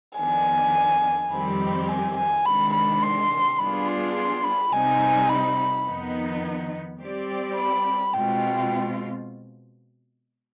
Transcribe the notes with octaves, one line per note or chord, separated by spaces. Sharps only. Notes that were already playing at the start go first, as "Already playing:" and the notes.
F2 D#3 B3 D4 G#5
F2 D#3 G3 C4 G4 B5
G#5
G#5
C3 D#3 G#3 D4 B5
B5
C6
G3 B3 D4 F4 G#4 B5
C6
C6
B5
C3 G3 C4 D#4 G#5
B5
F2 D#3 B3 D#4
G3 C4 G4 D5
B5
B2 G#3 C4 F4 G5